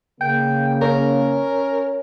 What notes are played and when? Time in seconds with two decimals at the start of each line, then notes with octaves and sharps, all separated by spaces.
0.21 C#3 A#3 G5
0.82 C#4 A#4